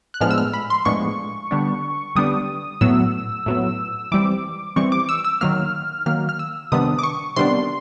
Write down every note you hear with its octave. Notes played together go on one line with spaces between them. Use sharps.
F#6
A2 F3 G#3 B3 D4 F6
E6
F6
B5
C6
A2 F3 G#3 B3 D4 C#6
D3 G3 B3 D4
D3 G3 B3 D4 D#6
A2 F#3 B3 E6
A2 F#3 B3
E3 G3 C4 D6
E3 G3 C4 C#6
D6
E6
E6
D#3 F#3 A#3 F6
D#3 F#3 A#3 F6
F6
E6
C3 D#3 G3 B3 D4 D#6
D6
C#6
C3 D#3 G3 B3 D4 C6